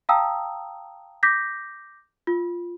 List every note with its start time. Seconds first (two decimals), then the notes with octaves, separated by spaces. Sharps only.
0.09 F5 G5 A5 A#5 D#6 E6
1.23 D6 G6 A#6 B6
2.27 F4